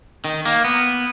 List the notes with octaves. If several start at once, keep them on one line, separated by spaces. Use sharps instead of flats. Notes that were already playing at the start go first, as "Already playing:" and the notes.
D#3
A#3
B3